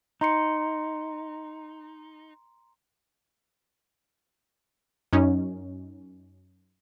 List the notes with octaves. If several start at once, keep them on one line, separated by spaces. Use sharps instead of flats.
D#4 A#5 C6 C#7
F#2 C#4 D#4